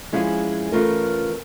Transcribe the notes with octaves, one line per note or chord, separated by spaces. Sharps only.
F3 G#3 C#4 E4 G#4
E3 A3 C#4 F4 A#4